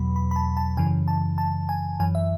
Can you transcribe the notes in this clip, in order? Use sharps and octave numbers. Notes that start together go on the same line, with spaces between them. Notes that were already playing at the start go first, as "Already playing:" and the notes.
Already playing: E2 B2 F#3 B5
B5
B5
A5
A5
F#2 C#3 E3 G#5
A5
A5
G#5
F#2 E3 G#5
E5